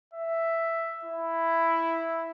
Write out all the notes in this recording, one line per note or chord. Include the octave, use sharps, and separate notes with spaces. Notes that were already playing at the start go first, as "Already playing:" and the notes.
E5
E4